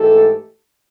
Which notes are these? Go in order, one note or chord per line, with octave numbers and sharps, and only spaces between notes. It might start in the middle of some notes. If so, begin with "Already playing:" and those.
Already playing: G#2 E3 A3 G4 A4